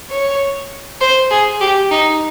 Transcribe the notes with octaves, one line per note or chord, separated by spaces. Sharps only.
C#5
C5
G#4
G4
D#4